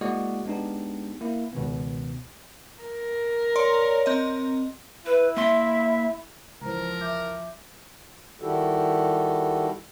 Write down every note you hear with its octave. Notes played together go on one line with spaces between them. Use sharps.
G#3 A#3 E4 F#4 D5 D#5
G#3 B3 D4 D#4 G4
A#3 E4
C#2 B2 D#3 B3
A#4
C#5 D5 C6
C4 D#5
E4 B4
A#3 E5 C6
C#2 E3 F3 A#4 C5 A#5
E5 D6 G6
D#3 G3 E4 F#4 G4 A4